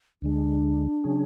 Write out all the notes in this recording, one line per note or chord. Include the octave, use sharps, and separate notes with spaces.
D2 D3 G#3 D4
C#3 F#3 C#4 G#4